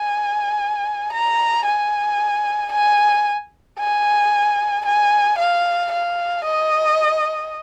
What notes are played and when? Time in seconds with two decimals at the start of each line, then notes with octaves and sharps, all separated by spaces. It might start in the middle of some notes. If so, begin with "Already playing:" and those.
Already playing: G#5
1.13 A#5
1.66 G#5
2.72 G#5
3.79 G#5
4.86 G#5
5.39 F5
5.92 F5
6.45 D#5